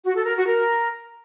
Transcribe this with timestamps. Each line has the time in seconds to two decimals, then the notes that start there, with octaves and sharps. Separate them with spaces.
0.04 F#4
0.15 A4
0.25 A#4
0.36 F#4
0.46 A#4